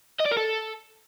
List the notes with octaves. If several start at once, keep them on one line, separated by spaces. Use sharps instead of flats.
D#5
D5
A#4
A4